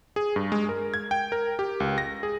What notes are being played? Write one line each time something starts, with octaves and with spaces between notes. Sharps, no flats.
G#4
G2
G#3
A#4
G#6
G5
A#4
G4
C#2
A#6
G#4